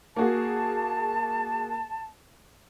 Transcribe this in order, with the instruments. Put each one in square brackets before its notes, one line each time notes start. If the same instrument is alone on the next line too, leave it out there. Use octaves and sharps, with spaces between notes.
[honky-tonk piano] A#3 F#4 G#4 [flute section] A5